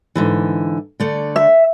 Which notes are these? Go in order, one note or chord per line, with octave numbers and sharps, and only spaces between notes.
G#2 D3 E3
D3 A3 D5
E5